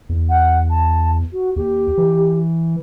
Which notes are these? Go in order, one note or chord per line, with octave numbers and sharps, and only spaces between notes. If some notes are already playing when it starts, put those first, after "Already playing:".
E2
F#5
A5
F#4
D#2 G4
E3